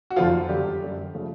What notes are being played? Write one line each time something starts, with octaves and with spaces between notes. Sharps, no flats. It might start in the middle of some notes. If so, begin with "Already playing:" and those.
F#4
F1 F2 D3 F3 F#3 F4
F#2 D3 G3 G4
F#2 D3 G3
C#3 F3 A3